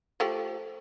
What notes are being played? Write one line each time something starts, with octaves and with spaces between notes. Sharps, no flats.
F3 A3 G4